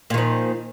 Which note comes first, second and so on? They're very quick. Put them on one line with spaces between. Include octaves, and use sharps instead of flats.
A#2 D#3 F3